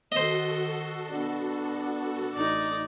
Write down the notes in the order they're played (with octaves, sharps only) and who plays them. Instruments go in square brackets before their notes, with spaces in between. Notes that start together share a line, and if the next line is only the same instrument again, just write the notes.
[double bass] D#3 [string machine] F#4 A4 [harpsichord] C5 D#5
[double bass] B3 D4
[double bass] A1 [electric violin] D#4 D5